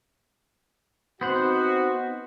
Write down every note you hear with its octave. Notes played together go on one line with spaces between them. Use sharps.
B3 C4 D#4 F#4 C5 F#5